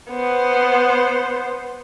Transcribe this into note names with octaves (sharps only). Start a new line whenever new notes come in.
B3 C5